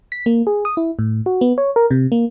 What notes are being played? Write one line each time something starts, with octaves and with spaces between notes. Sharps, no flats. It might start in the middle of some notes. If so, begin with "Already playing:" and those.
B6
A#3
G#4
D#6
E4
A2
F#4
B3
C#5
A#4
C3
A#3